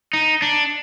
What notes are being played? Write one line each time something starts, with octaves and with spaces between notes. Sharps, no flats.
D#4
D4